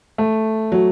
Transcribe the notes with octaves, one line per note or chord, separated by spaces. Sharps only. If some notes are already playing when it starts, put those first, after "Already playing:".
A3
F#3